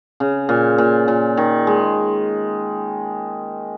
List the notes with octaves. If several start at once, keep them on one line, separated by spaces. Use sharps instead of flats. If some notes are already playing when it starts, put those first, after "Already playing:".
C#3
A#2
A#2
A#2
D#3
G#3